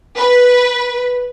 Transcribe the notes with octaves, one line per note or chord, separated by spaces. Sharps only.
B4